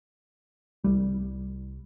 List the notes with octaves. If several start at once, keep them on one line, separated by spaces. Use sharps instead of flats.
C2 G3